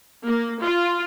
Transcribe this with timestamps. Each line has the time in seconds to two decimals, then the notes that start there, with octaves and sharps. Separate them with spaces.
0.24 A#3
0.59 F4